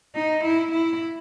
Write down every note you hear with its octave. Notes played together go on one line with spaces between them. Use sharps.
D#4
E4
E4